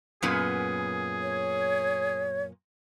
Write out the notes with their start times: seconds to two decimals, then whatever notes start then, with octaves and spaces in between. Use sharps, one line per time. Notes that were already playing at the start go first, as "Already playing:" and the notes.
0.23 F#2 A#2 B3 G#4
1.23 C#5